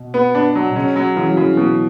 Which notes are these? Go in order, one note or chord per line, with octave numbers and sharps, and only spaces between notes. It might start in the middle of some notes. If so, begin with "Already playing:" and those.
Already playing: B2
B3
D4
F#3
B2
C#3 C#4
F#3
C#3 E3
F#3
C#3
E3
B2 F#3